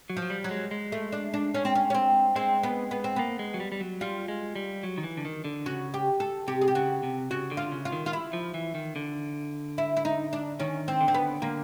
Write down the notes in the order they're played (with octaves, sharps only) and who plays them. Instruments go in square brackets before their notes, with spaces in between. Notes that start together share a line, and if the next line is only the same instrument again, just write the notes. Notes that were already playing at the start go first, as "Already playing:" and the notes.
[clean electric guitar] F#3
[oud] F3
[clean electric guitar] F#3
G3
[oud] F#3
[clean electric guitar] G#3
G#3
[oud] A3
D4
D4
C#4
C4
C#4
C#4
C4
[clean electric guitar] G#3 [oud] C4
[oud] B3
B3
C4
[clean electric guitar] A#3 [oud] B3
[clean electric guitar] G#3
F#3
G3
G3
F#3
[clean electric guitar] G3 [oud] F4
[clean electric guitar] G#3
G3
F#3
D#3
E3
D3
D#3
D3
[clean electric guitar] C#3 [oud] F#4
[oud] G4
A4
[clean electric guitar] C3 [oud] G4
[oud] G#4
G4
[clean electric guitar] C#3 [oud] F#4
[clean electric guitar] C3
[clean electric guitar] C#3 [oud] F#4
[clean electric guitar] D3
[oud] F4
[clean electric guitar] C#3
[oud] F4
[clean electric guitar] D#3
[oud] F4
E4
[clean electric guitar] F3
E3
D#3
D3
[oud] E4
E4
D#4
D4
[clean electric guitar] D#3 [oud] C#4
[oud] C4
[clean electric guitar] D3
[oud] C4
B3
[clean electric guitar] D3 [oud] A#3